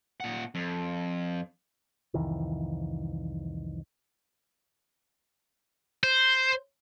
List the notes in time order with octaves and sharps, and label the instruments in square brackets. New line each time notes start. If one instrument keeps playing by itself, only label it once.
[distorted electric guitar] A#2 F#5
F2
[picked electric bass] C2 F2 D#3 E3
[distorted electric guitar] C5